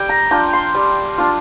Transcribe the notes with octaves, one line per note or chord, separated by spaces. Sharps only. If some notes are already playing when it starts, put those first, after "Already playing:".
Already playing: G3 G5
A#5
D4 F4 G5
C6
G3
D4 F4